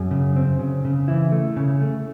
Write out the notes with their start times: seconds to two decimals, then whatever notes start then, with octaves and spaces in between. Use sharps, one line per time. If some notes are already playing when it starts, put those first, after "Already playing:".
Already playing: F#2 G#4
0.11 C#3
0.36 C4
0.59 C#3
0.85 C#3
1.08 E3 E4
1.32 A3
1.56 C#3
1.81 A3